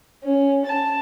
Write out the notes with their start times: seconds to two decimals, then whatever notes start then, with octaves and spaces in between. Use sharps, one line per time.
0.24 C#4
0.66 A5